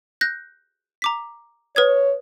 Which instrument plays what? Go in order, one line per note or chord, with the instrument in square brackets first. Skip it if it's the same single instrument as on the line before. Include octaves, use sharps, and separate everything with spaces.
[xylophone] F#6 G6 A#6
A#5 D6 B6
[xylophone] B4 D#6 G#6 [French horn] C#5